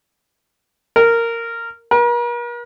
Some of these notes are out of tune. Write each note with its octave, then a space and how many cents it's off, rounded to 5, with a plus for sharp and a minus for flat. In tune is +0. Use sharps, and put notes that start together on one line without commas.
A#4 -10
A#4 +45